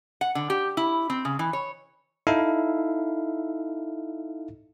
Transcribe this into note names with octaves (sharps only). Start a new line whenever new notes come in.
F#5
D3
G4
E4
C4
C#3
E3
C#5
D#4 E4 A4 E5 F5